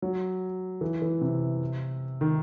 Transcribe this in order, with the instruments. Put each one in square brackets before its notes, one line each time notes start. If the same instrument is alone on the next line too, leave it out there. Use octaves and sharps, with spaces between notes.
[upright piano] F#3
E3
E3
C3
D#3